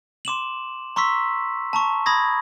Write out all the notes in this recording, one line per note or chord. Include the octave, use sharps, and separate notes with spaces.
C6 D6 E7 F#7
A#5 C6 C#6 E6 B6
A5 A#5 C#6
B5 D#6 G#6 A#6